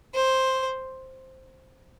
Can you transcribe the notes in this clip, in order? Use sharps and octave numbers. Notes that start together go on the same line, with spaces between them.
C5